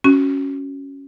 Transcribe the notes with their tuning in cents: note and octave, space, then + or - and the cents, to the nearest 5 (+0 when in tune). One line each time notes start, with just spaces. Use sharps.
C#4 +0 F#4 +10